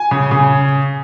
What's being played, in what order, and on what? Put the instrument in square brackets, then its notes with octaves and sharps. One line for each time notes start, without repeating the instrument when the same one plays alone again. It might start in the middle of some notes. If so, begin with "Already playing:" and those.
Already playing: [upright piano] G#5
C#3
C#3